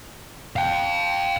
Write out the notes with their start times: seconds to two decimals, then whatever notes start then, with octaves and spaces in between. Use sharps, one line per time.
0.56 F5 G5